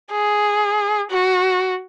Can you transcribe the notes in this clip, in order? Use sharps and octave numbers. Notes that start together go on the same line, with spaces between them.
G#4
F#4